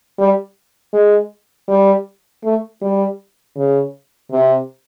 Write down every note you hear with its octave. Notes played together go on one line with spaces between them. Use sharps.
G3
G#3
G3
A3
G3
C#3
C3